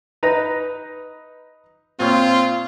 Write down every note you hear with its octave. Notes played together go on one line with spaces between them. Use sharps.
D#4 B4 A#5
A#2 C4 F4 C#5